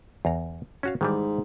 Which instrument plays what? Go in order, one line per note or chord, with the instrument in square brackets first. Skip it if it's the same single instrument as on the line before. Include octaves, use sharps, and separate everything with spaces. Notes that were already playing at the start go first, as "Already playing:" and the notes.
[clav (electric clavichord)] E2 A#5
C#4 F#4 F5
[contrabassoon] G#2 [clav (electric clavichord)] D#3 E3 G3